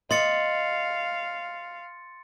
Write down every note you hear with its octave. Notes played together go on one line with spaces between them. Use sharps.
D#5 F5 C6 A6 C#7